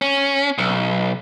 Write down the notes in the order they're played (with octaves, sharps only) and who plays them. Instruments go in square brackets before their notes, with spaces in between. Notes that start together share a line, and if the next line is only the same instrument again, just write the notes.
[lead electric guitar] C#4
B1